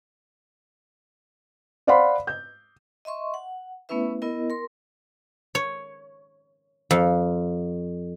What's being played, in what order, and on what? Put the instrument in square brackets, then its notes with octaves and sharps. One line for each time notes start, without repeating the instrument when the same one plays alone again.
[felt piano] C5 D5 F5 F#5 B5 C6
G6
[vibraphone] D#5 E5 C6 C#6
F#5
A3 B3 C#4 E4 B4 E5
B3 E4 A#4 D#5
A#4 C6
[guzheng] C#5
F2